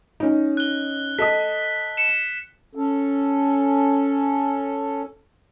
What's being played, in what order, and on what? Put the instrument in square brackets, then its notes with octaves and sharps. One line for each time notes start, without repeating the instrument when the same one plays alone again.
[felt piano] C#4 D#4
[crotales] F#6 G7
[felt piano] A4 D#5 D#6 [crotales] B6
[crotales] C#7 E7
[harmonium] C#4 A4